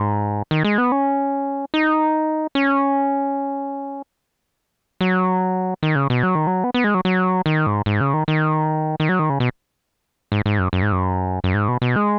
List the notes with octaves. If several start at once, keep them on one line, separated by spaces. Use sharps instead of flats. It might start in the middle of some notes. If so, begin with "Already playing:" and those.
Already playing: G#2
D#3
G#3
B3
C#4
D#4
C#4
F#3
D#3
C#3
B2
F#3
D#3
F#3
B3
B3
G#3
F#3
F#3
D#3
G#2
G#2
C#3
D#3
D#3
D#3
F#3
D#3
C#3
B2
G#2
G#2
F#2
F#2
G#2
F#2
F#2
G#2
B2
B2
G#3